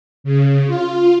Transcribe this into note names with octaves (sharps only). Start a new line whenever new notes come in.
C#3
F4